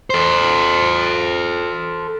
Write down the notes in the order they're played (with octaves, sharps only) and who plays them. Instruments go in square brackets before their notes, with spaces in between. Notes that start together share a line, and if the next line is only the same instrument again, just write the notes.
[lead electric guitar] A4 C5